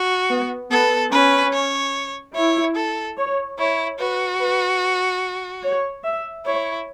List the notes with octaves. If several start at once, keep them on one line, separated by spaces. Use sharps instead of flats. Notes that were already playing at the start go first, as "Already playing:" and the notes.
Already playing: F#4
B3
B3 A4
C#4 B4
C#5
E4 C#5
A4
C#5
E4 C#5
F#4 B4
B4
C#5
E5
E4 C#5